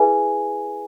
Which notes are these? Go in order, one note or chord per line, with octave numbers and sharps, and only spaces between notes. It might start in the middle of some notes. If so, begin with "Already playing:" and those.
Already playing: E4 G#4 B4 E5 G#5